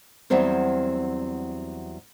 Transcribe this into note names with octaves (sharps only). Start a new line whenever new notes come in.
E2 F#3 G3 C4 C5